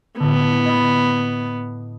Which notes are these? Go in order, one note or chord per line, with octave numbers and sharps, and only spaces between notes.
A2 D3 B3
D#5 B5